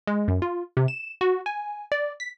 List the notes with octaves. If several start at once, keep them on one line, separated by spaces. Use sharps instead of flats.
G#3
F#2
F4
C3
E7
F#4
G#5
D5
B6